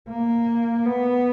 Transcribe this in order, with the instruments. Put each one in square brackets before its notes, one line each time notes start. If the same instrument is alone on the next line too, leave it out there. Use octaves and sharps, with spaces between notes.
[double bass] A#3
B3